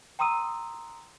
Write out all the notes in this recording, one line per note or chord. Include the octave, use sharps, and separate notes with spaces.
G5 A#5 C6 D#6 E6 D#7